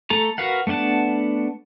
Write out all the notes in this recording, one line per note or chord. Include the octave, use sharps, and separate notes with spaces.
A3 A4 A#5
F#4 A#4 B4 F5 F#5
A3 B3 D4 F#5 A5